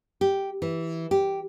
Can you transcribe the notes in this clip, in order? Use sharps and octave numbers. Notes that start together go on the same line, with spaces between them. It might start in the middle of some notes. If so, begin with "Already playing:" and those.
G4
E3
G4